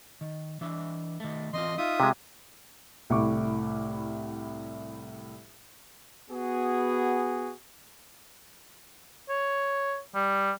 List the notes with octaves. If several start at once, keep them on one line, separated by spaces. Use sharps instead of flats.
D#3
E3 D4 E5
D#3 A3
E3 C4 F4 D#5 C6
D#4 F4 E5 D#6
C3 G#3
C2 A2 C#6 D6
B3 F#4 G#4
C#5
G3